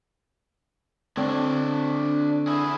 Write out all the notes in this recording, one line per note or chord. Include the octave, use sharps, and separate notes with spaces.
D3 C4 D4 C#5
E4 G#4